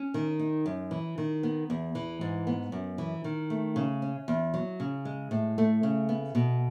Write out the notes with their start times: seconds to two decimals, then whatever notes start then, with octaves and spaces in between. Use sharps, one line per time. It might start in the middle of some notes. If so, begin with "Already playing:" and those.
Already playing: C#4
0.14 D#3
0.39 D#4
0.66 F#2
0.91 E3
1.18 D#3
1.43 B3
1.70 E2
1.95 E3
2.21 G#2
2.47 B3
2.72 F#2
2.98 E3
3.24 D#3
3.50 A3
3.76 C#3
4.02 C#4
4.28 E2
4.54 F#3
4.80 C#3
5.05 G#3
5.31 A2
5.58 A3
5.83 C#3
6.09 B3
6.35 B2